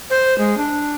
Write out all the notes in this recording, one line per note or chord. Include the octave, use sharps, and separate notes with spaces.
C5
G#3
D4